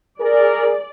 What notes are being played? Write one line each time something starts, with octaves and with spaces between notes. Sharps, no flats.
G#4 A#4 D5